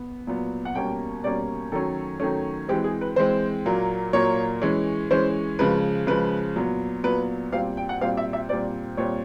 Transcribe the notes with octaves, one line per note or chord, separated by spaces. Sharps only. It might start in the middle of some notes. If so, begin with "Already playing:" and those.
Already playing: B3
A#2 F#3 B3
F#5
B2 G3 A#3 C#4 G5
B2 G3 A#3 C#4 D5
D#3 F#3 A3 C#4 A4
D#3 F#3 A3 C#4
E3 G#3 C4 G4
G#4
B4
E3 G#3 C4 C5
A#2 F#3 A#3
A#2 F#3 A#3 C#5
E3 G#3 C#4
E3 G#3 C#4 C5
C#3 F3 G#3 B4
C#3 F3 G#3 B4
A#2 F#3 B3
A#2 F#3 B3 B4
A#2 G3 C4 F5
G5
F#5
A#2 G3 C4 F5
E5
E5
A#2 G3 C4 D5
A#2 G3 C4 C#5